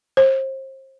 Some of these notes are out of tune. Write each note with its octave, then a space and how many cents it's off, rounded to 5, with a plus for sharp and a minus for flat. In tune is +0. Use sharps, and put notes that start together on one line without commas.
C5 +35